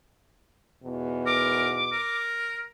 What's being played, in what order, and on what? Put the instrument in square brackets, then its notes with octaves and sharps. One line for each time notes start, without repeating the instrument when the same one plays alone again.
[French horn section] E2 G#2 B2
[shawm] A#4 [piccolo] D6
[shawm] A#4